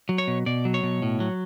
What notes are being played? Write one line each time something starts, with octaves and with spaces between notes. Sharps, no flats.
F#3
C#5
B2
B2 D5
F#3
C#5
B2
A2
F#3